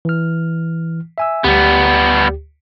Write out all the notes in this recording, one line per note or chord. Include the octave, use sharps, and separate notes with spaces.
E3 F6
E5 G#5 E6
D2 G3 B3 G4